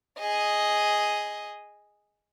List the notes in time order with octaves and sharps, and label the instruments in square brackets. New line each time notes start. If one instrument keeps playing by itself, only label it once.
[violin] G#4 D#5